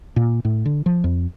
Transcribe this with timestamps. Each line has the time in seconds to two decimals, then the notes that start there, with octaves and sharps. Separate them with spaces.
0.16 A#2
0.45 A2
0.66 D3
0.86 F3
1.04 F2